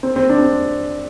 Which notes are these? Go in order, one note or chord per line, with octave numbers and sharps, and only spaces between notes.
C4
C4
D4
C4